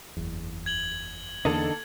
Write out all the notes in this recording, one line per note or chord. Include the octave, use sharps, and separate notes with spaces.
F#1 E2
G#6 F#7 G7
E2 D3 A#3 D#4 A4